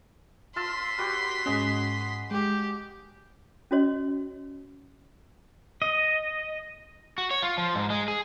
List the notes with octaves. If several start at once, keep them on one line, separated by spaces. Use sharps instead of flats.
F4 A5 C6 E6 B6
F#4 G4 B4
G#2 C#4 F#4 G#4 D#5
G#3 G4 D6
C#4 F#4 C#5 D#5
D#5
F#4
C#5
F4
F3
G#2
G#3
G#4